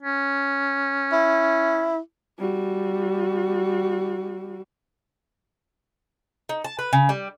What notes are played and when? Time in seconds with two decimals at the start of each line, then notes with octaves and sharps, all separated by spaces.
0.03 C#4
1.12 E4
2.38 G3 F#4
6.49 D#4
6.64 A5
6.79 B4
6.93 C#3
7.09 G3